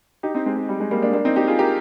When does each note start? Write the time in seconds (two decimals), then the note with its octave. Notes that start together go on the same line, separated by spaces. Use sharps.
0.23 D#4 G4
0.35 C4 D#4
0.46 G#3 C4
0.57 G#3
0.69 G3
0.80 G#3
0.91 G3 A#3
1.02 A#3 D4
1.13 A#3 D4
1.25 C4 D#4
1.36 D#4 G4
1.47 F4 G#4
1.59 G4 A#4